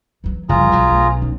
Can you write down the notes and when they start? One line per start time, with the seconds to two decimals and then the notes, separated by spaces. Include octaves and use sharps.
0.24 E3 F#3
0.49 F#1 F3 G3 F4 G#4 A#5
0.72 B1 F#3
0.89 A3 D4
1.21 C#4 D#4